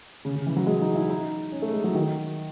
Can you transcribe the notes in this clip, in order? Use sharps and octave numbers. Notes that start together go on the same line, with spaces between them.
C#3
C#3
E3
F#3
G#3
D#4
E4
D#4
C#4
A3
G#3
F#3
D#3